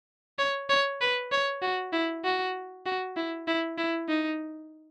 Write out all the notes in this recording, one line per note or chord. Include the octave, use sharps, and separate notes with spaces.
C#5
C#5
B4
C#5
F#4
E4
F#4
F#4
E4
E4
E4
D#4